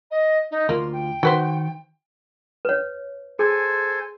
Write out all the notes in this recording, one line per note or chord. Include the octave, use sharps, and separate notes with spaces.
D#5
D#4
D2 A#3 F4 C6
G5
D#3 F#4 B4 C5
B4 C#5
G#4 A4 C5 G#5